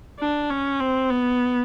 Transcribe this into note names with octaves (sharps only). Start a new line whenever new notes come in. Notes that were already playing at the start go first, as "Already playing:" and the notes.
D4
C#4
C4
B3